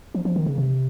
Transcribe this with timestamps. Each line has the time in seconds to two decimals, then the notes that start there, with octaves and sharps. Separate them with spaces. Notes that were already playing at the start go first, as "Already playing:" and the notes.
0.15 F3
0.25 F3
0.36 D#3
0.46 C#3
0.58 C3